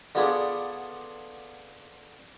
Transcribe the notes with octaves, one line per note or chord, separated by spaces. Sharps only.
D3 B3 F4 G#4 B4 D5